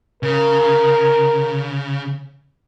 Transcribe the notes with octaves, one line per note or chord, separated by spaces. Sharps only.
C#3 A#4